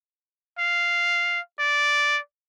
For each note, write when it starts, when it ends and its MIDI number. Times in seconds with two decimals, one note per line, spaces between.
0.59 1.40 77
1.60 2.19 74